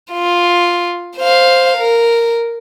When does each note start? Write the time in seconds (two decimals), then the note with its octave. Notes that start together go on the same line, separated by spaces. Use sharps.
0.12 F4
1.18 C5 F5
1.78 A#4